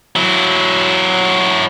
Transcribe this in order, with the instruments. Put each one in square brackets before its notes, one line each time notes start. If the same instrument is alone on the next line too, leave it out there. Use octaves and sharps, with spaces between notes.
[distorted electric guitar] F#3 E4